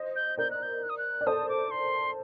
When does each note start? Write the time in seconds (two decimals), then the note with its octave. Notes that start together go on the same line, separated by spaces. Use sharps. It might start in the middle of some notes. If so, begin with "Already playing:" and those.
Already playing: C5 D#5
0.16 G6
0.38 A#4 D5 G6
0.51 F#6
0.63 G6
0.83 F#6
0.89 D#6
0.98 F#6
1.21 D5
1.27 A4 C5 D#6
1.49 D6
1.71 C6